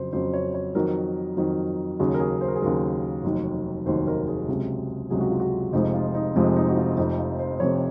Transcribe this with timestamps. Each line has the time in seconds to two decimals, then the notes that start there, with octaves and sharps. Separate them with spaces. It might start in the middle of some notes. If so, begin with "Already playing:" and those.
Already playing: F2 C#3 F#3 C5
0.13 F2 C#3 F#3 C5
0.33 C#5
0.54 C#5
0.75 F2 D#3 F#3 A#4
1.37 F2 D#3 F#3
2.00 D#2 C#3 F#3 G#4
2.14 A#4
2.20 G#4
2.41 C5
2.48 A#4
2.56 G#4
2.62 D#2 C#3 F#3 A#4
3.24 F1 D#2 D#3 F#3
3.86 F1 D#2 D#3 F#3 C5
4.08 A#4
4.27 G#4
4.48 C#2 C3 F#3
5.10 C#2 C3 F#3 G#4
5.21 F#4
5.30 F4
5.40 F#4
5.73 F1 F2 C3 F3 G#3 D#4
5.94 F4
6.15 D#4
6.35 F1 F2 C3 F3 G#3 F4
6.56 D#4
6.69 F#4
6.77 F4
6.97 F1 F2 C3 D#4
7.18 F4
7.39 C5
7.60 F1 F2 C3 C#5